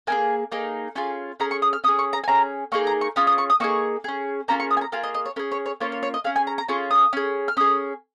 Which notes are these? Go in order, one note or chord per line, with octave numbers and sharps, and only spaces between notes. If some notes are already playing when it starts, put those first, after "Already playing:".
A#3 D#4 G#4 G#5
A#3 D#4 G#4
C#4 F4 G#4 G#5
C#4 G#4 A#5
C#6
D#6
F6
C#4 G#4 D#6
C#6
A#5
G#5
C#4 G#4 A#5
A#3 D#4 G#4 C#6
A#5
C#6
C#4 F4 G#4 D#6
D#6
C#6
D#6
A#3 D#4 G#4 C#6
C#4 G#4
A#3 C#4 F4 G#4 A#5
C#6
D#6
G#5
A#5
A#3 F4 G#4 F5
D#5
D#5
C#5
C#4 G#4 A#4
C#5
C#5
A#3 C#4 F4 C#5
C#5
C#5
D#5
C#4 G#4 F5
G#5
A#5
A#5
C#4 F4 G#4 C#6
D#6
C#4 G#4
F6
C#4 G#4 D#6